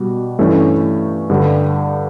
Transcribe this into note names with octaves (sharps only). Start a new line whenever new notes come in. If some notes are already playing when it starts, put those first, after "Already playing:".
Already playing: B2 G3 F#4
G2 E3 A3 C#4
G2 D3 G3